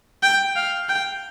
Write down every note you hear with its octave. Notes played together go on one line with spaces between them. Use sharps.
G5
F5
G5